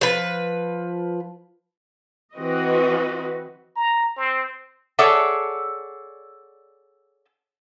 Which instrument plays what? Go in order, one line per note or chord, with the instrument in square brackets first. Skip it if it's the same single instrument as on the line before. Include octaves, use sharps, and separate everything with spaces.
[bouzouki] F3 B4
[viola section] E3 C4 F#4 B4 D#5
[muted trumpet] A#5
C4
[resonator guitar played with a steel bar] G#4 A4 C#5 D5 E5 F#5